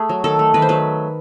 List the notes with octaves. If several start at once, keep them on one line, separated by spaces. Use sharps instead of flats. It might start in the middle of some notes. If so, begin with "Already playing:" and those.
Already playing: A3 G#4
F#3
D#3 A4
A3
D#3 B4
C5
F#3 B4